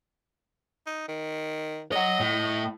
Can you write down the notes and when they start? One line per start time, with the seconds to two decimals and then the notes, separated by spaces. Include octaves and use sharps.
0.87 D#4
1.09 D#3
1.92 C#5 D#5 F#5
2.20 A2